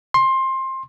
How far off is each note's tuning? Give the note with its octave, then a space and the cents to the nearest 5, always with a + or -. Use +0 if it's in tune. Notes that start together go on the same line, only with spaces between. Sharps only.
C6 +20